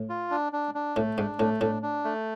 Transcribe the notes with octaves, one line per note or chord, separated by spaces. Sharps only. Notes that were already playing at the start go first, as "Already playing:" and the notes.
Already playing: A2
F4
D4
D4
D4
A2 A3
G#2 D4
A2 A3
A2 D4
D4
A3